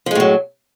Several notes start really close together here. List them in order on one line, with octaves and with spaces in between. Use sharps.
F3 G#3 A2 F#3